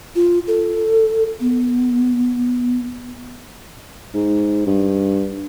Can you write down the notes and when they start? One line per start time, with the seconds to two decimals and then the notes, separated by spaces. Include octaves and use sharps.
0.15 F4
0.47 A4
1.40 B3
4.15 G#2
4.67 G2